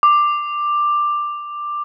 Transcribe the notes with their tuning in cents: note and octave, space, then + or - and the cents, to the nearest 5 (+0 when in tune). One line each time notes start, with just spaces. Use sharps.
D6 +10